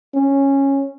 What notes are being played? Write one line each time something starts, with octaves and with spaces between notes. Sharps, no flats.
C#4